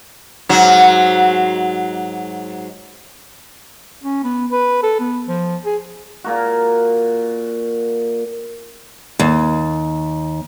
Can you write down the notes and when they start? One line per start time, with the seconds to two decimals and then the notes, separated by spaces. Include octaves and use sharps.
0.49 G#2 F#3
4.03 C#4
4.24 B3
4.52 B4
4.83 A4
5.00 B3
5.29 F3
5.65 G#4
6.24 A#2 A#3 F#4
9.19 D#2